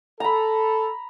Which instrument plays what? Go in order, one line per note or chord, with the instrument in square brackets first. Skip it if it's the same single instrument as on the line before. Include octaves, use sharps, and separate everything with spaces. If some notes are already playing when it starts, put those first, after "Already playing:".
[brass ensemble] A4 [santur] A#5 B5